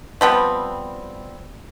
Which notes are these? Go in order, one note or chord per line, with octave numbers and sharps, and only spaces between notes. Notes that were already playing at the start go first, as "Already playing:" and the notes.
F3 G3 B3 C4